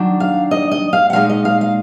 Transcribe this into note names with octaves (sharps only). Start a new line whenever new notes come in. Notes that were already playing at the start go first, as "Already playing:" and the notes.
Already playing: D#3 F#3 D4
F5
D#5
D#5
F5
F#5
A#2 G#3 D#4 F5
D#5
F5
F5